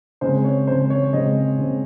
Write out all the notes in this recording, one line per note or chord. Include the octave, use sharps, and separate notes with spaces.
C#3 G#3 C4 C5
C#5
C#3 G#3 C4 C5
C#5
C#3 G#3 C4 D#5
C#3 G#3 C4